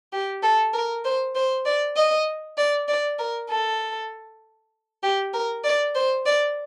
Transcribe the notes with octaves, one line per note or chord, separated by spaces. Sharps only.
G4
A4
A#4
C5
C5
D5
D#5
D5
D5
A#4
A4
G4
A#4
D5
C5
D5